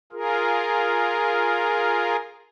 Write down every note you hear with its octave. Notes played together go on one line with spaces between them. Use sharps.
F4 G#4 A#4